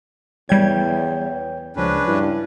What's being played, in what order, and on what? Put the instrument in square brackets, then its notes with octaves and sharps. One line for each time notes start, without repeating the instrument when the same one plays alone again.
[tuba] E2 [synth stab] G3 G#6 [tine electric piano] C#5 G5 G6
[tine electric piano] D2 F3 G#3 [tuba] C#3 [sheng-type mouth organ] C#4 D4 B4
[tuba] G2 [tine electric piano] E4